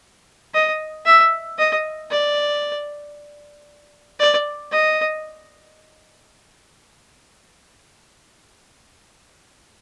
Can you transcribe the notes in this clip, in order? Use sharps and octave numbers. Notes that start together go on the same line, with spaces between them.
D#5
E5
D#5
D5
D5
D#5